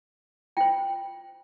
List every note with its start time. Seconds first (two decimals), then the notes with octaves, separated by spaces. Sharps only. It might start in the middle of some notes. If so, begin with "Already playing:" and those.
0.57 F4 C5 G5